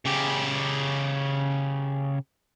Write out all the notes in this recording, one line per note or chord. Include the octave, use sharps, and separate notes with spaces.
C#3 G4